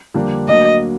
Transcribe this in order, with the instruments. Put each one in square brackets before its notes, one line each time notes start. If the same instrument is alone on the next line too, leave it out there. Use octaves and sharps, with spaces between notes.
[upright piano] F2 D3 G3 A#3 D4
[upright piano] D2 D3 F#3 A#3 [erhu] D#5